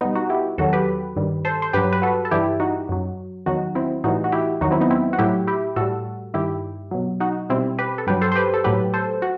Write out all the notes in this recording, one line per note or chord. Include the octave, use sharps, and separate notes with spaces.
B2 G3 B3 D#4
D#4 F#4
E4 G4
E2 D#3 F#3 F#4 A4
G4 B4
G2 D#3 G3
A4 C5
C5
G2 F#3 G4 B4
B4
F#4 A4
A4
G2 E3 G3 E4 G4
D#4 F#4
F#2 F#3
E2 D#3 F#3 D#4 F#4
C4 E4
A2 E3 G3 D#4 F#4
F#4
E4 G4
E2 D#3 F#3 D#4 F#4
C4 E4
B3 D#4
C4 E4
F#4
A2 F#3 E4 G4
E4 G4
A2 G3 F#4 A4
G2 D#3 G3 E4 G4
B2 F#3
D#4 F#4
B2 G3 C4 E4
G4 B4
A4
G2 F#3 G4 B4
A4 C5
C5
G4 B4
A4
A2 F#3 G4 B4
A4 C5
F#4